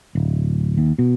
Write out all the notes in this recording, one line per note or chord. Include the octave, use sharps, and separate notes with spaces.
D1
D#2
B2